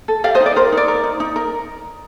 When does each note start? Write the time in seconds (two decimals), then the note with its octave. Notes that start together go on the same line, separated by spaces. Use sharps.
0.08 A4
0.24 G4 D5 F5
0.35 C5 D#5
0.40 D#4
0.46 D5
0.56 A#4 C5
0.72 D#4
0.77 D5
0.88 A#4
1.03 D#4
1.20 D#4
1.36 A#4